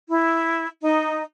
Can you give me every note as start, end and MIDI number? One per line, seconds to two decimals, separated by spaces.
0.09 0.66 64
0.82 1.22 63